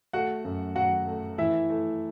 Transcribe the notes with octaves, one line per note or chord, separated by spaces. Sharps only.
A3 F#4 F#5
F#2
F#3 F#4 F#5
A3
E3 E4 E5
A3